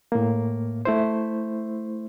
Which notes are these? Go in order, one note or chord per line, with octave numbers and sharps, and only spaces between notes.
A2 A#3
A3 E4 C5